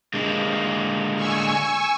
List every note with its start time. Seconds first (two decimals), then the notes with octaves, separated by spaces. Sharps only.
0.14 D3 G#3 A#3
1.15 G#5 C#6 E6